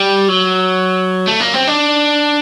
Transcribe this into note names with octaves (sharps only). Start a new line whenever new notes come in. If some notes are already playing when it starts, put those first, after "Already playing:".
Already playing: G3
F#3
A3
A#3
C4
D4